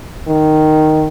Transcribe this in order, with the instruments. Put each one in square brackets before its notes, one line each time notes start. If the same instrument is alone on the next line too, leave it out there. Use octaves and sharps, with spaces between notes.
[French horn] D#3